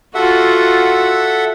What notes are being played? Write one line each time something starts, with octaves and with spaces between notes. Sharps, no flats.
F4 F#4 A4 E5 F#5